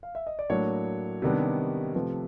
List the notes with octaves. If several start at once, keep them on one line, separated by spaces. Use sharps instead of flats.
F5
E5
D#5
D5
A2 F#3 A#3 D4 C#5
C3 D#3 G3 B3 D4
C3 F3 A3 C4 B4